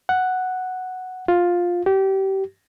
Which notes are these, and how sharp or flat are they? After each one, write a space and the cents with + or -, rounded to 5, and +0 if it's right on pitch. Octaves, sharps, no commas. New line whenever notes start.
F#5 +0
F4 +10
G4 -25